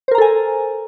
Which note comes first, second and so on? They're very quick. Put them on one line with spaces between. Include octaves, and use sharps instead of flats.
C5 A#4 A#5 A4 G#5